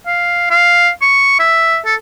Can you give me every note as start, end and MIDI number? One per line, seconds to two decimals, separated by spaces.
0.07 0.49 77
0.50 0.90 77
1.02 1.38 85
1.40 1.78 76
1.85 1.95 69